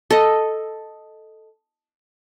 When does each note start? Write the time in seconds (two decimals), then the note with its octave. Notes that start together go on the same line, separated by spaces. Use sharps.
0.10 A4 D#5